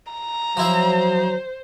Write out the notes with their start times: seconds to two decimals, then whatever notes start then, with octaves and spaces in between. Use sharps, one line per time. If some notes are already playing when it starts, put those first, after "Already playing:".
0.13 A#5
0.57 F3 F#3 E4 C5 E5